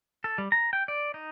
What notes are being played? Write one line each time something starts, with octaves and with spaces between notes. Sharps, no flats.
A4
G3
A#5
G5
D5
D#4